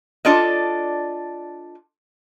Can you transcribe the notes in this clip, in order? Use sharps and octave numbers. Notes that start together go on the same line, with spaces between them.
D4 F4 A4 D5 D#5